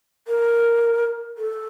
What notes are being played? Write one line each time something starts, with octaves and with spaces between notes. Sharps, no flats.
A#4
A4